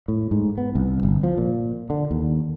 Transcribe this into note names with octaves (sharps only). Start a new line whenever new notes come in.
A2
G#2
B3
C2
G1
F3
A#2
D3
D#2